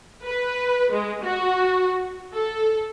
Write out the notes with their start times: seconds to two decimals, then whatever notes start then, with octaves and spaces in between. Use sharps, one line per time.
0.24 B4
0.92 G#3
1.24 F#4
2.32 A4